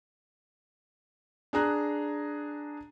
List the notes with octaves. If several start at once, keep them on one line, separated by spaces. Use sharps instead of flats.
D4 G#4 A#5 F#6